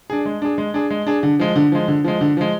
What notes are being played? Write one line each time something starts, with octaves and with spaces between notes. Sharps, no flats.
D4 G#4
G#3
D4 G#4
G#3
D4 G#4
G#3
D4 G#4
D3
F3 G#3
D3
F3 G#3
D3
F3 G#3
D3
F3 G#3